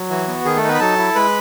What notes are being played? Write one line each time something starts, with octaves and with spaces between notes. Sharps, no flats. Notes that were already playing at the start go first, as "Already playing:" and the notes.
Already playing: F#3
E3 F#4
B3
D#3 G#4
A3 A4
D#4
B3 B4
B5
F#3 A4 A5
E4
G#3 B4 B5